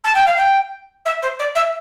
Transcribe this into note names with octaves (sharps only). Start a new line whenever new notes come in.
A5
G5
F5
G5
E5
C5
D5
E5